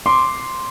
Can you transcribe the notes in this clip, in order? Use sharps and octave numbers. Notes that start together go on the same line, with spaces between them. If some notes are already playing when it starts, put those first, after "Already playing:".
C6 D6